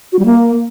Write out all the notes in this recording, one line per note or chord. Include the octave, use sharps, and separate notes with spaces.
F#4
G3
A#3